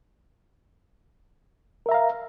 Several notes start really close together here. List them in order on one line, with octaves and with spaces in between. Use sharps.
A#4 E5 A#5 F5